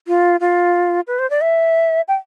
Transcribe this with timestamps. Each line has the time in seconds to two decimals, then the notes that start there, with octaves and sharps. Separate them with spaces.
0.07 F4
0.40 F4
1.07 B4
1.19 C5
1.30 D5
1.41 E5
2.08 G5